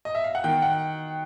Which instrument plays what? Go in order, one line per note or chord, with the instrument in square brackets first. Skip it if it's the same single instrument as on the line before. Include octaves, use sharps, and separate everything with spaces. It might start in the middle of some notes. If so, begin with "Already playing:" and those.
[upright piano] D#5
E5
F5
F#5
D#3 G5
F#5